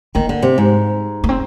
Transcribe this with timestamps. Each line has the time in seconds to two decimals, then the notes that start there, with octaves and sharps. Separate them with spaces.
0.15 D#3 A#3
0.29 D3
0.43 C3
0.58 G#2
1.24 A#3
1.29 C4